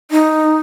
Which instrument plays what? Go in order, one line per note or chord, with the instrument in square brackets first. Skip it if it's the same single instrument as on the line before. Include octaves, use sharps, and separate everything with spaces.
[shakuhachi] D#4